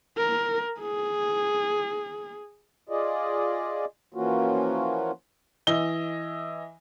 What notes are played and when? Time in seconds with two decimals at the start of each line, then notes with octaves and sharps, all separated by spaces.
0.18 A#4
0.80 G#4
2.89 F4 G#4 D5 D#5
4.14 E3 F3 A#3 C#4 F4 F#4
5.67 E3 D#5 G7